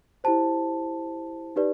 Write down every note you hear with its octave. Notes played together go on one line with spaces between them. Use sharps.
E4 G4 C5 A5
D#4 G4 B4 D5